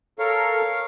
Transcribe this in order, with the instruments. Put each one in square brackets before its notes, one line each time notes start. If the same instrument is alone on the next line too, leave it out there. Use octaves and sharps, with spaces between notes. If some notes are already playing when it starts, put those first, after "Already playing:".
[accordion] A4 A#4 [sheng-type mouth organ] C#5 F5